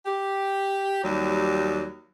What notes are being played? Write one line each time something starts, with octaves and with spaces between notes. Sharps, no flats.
G4
D#2 F#3 G3